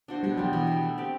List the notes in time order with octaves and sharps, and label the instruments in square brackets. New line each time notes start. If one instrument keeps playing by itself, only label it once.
[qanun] D4 F#4 C5
[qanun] B2 [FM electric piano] G3
[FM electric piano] F#3 [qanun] G3 B3
[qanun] B2 [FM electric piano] E3
[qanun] G3 B3
A3
C4 G4 D5